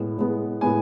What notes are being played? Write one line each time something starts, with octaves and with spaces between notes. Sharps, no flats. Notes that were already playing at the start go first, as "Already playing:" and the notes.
Already playing: A2 G#3 B3
A2 G#3 B3
A2 G#3 B3 G#5